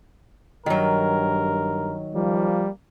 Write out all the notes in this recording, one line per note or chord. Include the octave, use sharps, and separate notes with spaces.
G2 D#3 F#3 A#4
F3 G3 A#3